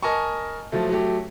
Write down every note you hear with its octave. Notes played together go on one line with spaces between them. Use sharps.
A#4 D#5 G#5 A5 C#6
F3 F#3 A3
F#3 A3 G4